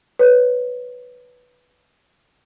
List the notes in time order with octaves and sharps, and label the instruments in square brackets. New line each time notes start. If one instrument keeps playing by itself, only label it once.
[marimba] B4 C#5